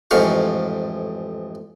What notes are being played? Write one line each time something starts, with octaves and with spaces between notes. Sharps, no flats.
A1 F2 G#2 F5 C#6